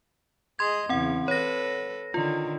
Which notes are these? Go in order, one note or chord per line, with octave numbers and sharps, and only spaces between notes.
G#4 D#5 C6 G#6
E2 C#3 C4 F#5
A4 B4 C#5 A#6
D3 D#3 F4